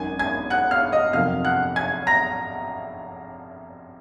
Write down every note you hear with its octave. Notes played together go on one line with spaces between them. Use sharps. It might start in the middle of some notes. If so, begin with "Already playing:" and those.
Already playing: G#1 F#2 D#3 G#5 G#6
G#5 G#6
F#5 F#6
F5 F6
D#5 D#6
F2 C3 F#3 A#3 D#4 F5 F6
F#5 F#6
G#5 G#6
A#5 A#6